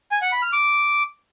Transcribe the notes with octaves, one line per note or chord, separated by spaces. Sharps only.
G#5
F#5
B5
F6
D6